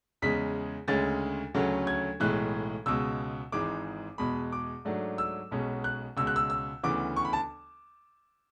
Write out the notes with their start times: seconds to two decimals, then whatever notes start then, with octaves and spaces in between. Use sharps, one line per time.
0.22 E2 C#3 G#3 B6
0.88 D2 C#3 G#3 C#4 A6
1.54 D2 C#3 F#3 A3 C#4
1.87 G#6
2.20 B1 A2 E3 G#3 F#6
2.86 C#2 B2 G#3 E6
3.52 G#1 G#2 E3 G#3 D6
4.18 E2 B2 G#3 B5
4.52 D6
4.85 G#2 F#3 A3 D4
5.18 E6
5.51 B1 B2 G#3 C#4
5.84 F#6
6.17 C#2 B2 G#3 E6
6.27 F#6
6.36 E6
6.50 E6
6.83 D2 C#3 E3 B3 D6
7.16 C#6
7.25 B5
7.33 A5